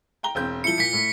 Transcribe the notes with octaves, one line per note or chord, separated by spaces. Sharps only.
G5 A#5 G7
E1 C4 G6
F3 E4 C#7 G7
A#2 B6 C#7
A2